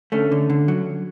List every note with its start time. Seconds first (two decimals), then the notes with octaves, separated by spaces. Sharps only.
0.12 D3 A3 C#4
0.32 D3
0.50 D3
0.68 F#3